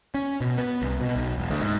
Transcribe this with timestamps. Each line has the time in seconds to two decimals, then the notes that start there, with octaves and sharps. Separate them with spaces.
0.14 C#4
0.41 B2
0.58 B3
0.82 C2
1.01 B2
1.15 B1
1.38 E1
1.51 D2
1.62 G#2